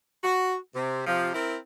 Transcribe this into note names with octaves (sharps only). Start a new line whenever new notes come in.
F#4
C3
C3 F3
C4 E4 A#4